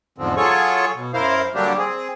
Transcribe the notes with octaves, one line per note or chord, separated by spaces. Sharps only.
E2 G#2 D3 F3 C4
F#3 F4 G#4 A4 C#5 C#6
B2
F#2 E4 A#4 C5 F5
D3 F#3 G3 A#3 D4 G4
C4 G#4